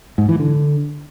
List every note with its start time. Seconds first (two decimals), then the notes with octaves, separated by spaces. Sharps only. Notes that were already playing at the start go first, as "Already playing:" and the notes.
0.18 G#2
0.29 E3
0.39 D3